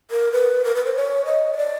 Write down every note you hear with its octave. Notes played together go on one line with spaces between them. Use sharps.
A#4
B4
A#4
B4
C5
C#5
D#5
C#5
D5